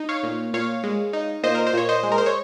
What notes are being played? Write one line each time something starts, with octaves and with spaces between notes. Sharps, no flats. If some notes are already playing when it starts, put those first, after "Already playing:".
Already playing: D#4
C#5 F5
A#2
A#2 C#5 F5
G#3
D#4
A#2 C5 D#5
A#4
C5
A#2 C#5
C5 D#5
G#3
A#4
C5
C#5